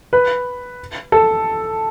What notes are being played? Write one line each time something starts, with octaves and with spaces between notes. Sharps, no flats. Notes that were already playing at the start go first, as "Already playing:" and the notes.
B4
A4